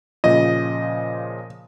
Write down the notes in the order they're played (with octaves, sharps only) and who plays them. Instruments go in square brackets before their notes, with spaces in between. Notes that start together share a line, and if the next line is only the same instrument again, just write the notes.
[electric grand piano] A#2 C#3 F3 [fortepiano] D#5